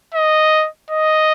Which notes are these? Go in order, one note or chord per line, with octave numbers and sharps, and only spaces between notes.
D#5
D#5